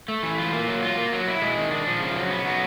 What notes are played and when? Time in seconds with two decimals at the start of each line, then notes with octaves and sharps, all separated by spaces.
0.08 A3
0.23 E3
0.38 F4
0.53 A#3
0.67 F#3
0.83 F4
0.97 A#3
1.13 F#3
1.28 E4
1.42 G#3
1.57 D#3
1.71 D4
1.87 F3
2.01 C#3
2.15 F#3
2.31 B3
2.45 F#3